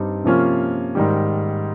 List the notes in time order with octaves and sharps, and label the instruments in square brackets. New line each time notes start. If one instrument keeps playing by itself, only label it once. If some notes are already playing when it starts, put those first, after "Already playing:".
Already playing: [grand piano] G2 G3 C4 D#4
C3 F3 A#3 C#4 F4
G#2 D#3 G3